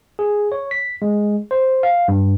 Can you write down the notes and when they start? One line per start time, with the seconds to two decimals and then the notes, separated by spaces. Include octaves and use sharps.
0.19 G#4
0.52 C#5
0.71 B6
1.02 G#3
1.51 C5
1.83 F5
2.08 G2